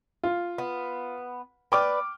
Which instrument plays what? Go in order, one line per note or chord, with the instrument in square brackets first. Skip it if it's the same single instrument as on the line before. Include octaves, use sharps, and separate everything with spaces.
[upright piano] F4
[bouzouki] B3
[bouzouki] B4 D5 [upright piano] G5 D6 F6